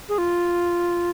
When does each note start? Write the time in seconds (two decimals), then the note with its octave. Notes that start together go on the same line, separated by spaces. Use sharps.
0.09 G#4
0.18 F4